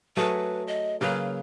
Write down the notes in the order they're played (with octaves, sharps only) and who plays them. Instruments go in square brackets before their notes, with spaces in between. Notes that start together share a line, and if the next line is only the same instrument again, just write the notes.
[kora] F#3 A3 G#4 [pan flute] B4
[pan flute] D#5
[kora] C#3 A#3 B4 [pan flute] F#3